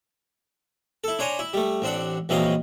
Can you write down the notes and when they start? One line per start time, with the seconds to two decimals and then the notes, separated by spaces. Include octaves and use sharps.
1.04 E4 A4
1.19 D4 C5 C#5 G#5 A#5
1.39 E4
1.53 G3 A3
1.82 A1 C4 D4 F#5
2.29 A#1 E3 F#3 C4 D#5 F5